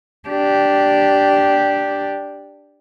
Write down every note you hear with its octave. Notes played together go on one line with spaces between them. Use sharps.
D4 G4